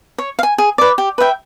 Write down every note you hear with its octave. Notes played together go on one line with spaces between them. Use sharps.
C#5
F5
G#5
G#4
B4 D5
G4
B4 E5 G5